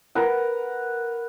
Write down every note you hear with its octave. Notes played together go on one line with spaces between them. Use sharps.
A#4 B4 F#5